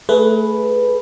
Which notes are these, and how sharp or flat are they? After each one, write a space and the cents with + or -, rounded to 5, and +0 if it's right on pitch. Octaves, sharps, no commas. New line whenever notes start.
A3 +0 G#4 +30 B4 +0